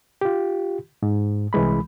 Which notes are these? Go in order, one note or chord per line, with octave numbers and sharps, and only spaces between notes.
F4 G4
G#2
C2 E3 G#3 B5